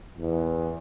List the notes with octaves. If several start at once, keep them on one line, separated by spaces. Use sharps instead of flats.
E2